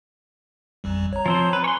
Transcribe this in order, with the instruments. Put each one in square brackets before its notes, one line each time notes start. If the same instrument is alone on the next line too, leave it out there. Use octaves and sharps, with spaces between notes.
[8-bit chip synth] A1 F2 G3
C#5 A#5
[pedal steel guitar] F3 C4 C5
B4
[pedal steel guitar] C#5 C6 [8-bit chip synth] G#5